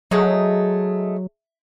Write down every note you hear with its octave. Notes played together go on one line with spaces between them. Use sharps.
F#3 G#3 A3 D#4